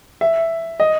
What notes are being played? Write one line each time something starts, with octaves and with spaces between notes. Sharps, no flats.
E5
D#5